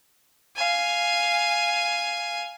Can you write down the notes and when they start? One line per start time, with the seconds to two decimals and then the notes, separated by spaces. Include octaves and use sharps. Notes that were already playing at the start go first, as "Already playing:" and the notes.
0.56 F5 G#5